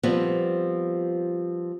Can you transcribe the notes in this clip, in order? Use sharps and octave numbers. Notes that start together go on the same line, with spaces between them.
F3 G3 B3 C4